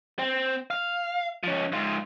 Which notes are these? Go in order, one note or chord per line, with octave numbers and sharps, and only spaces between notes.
C4
F5
F3 C#4
G#2 F4